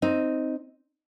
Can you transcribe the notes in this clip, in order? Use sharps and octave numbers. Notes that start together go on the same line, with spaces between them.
C4 D#4